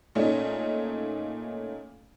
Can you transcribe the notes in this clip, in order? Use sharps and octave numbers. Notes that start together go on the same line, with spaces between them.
A#2 A3 C#4 D#4